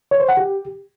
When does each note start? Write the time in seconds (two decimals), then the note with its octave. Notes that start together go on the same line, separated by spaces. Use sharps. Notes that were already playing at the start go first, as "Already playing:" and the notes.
0.11 C#5
0.20 C5
0.29 F#5
0.37 G4